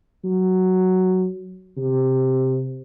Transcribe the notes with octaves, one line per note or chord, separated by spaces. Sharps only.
F#3
C3